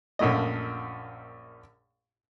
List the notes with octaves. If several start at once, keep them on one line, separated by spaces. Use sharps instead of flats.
A#1 F#2 A#2 A3 D#5